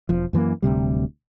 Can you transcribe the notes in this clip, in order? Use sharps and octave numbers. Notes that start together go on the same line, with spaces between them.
E1 F3
F#2 E3 F3 A#3
D1 D2 C3 G3